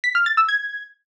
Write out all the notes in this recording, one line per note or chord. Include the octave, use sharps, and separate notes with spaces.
B6
F6
A6
E6
G#6